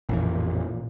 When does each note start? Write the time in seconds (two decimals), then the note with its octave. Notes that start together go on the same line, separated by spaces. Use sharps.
0.09 A1 F2 A#2 E3